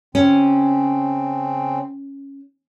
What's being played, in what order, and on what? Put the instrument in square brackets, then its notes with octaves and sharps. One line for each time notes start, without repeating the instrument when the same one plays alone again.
[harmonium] C#3 C4 [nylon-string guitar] C#4